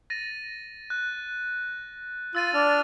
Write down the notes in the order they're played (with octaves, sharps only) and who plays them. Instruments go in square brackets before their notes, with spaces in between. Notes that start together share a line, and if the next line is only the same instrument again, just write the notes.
[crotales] A6 A#6 D#7
F#6
[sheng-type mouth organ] F4 [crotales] E6 A6 D#7
[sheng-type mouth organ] D4 F6